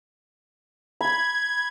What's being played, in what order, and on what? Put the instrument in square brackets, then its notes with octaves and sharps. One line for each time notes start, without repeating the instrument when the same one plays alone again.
[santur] B5 [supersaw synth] G#6